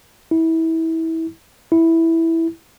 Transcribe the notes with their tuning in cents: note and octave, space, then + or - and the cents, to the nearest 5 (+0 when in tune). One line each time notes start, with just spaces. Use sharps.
E4 -25
E4 -5